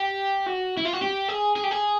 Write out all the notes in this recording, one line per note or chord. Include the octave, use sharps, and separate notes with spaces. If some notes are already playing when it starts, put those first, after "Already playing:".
Already playing: G4
F#4
E4
F4
F#4
G4
G#4
G#4
G4
G#4